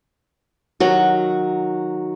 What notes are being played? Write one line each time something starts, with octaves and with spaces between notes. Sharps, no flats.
D#3 F#3 F#4